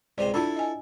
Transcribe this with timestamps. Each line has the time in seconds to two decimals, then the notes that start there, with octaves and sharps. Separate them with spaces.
0.18 C#2 C3 C5 D5
0.34 D4 E4 F4 A4 A5
0.56 D#5 G#5